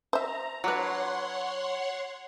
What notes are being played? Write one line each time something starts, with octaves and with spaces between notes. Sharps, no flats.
C5 E5 A#5
F#3 D4 B4 C#5 F#5 C6